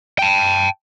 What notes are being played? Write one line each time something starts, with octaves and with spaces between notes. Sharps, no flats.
G5 A5